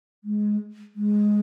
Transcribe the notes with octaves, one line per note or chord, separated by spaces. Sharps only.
G#3
G#3